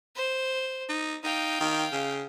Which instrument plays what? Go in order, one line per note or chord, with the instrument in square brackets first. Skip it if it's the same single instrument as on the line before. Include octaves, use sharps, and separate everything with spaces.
[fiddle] C5
[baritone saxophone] D#4
[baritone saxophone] D#4 [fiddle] F5 G5
[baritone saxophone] D#3
C#3